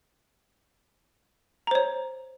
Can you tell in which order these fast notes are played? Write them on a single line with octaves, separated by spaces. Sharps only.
A#5 C5 C#5